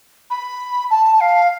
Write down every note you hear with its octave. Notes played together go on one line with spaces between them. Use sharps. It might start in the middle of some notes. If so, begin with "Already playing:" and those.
B5
A5
F5